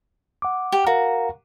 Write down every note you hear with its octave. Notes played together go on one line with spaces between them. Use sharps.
F#5 D6
G4
F#4 A#4 F5 A#5